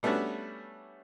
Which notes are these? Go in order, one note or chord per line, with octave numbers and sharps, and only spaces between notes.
G3 A3 B3 C#4 D4 F#4